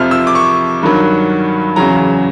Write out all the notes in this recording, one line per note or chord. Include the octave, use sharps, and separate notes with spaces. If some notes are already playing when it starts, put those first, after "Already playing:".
Already playing: F2 C3 F3 F6
E6
D6
C#6
G2 D#3 F#3
E2 C#3 F#3 A#5